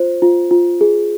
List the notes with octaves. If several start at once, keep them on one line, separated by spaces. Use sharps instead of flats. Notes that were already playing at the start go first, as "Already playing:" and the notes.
Already playing: F4 C5
F4
F4
G#4